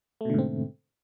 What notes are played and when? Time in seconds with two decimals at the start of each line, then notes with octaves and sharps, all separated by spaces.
0.21 A3
0.25 B2
0.30 D3
0.34 G#2
0.39 C4